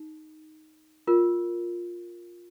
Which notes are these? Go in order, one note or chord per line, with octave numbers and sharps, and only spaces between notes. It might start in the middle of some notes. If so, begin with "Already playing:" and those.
Already playing: D#4
F4 A#4